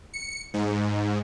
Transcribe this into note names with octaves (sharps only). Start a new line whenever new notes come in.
C#7
G#2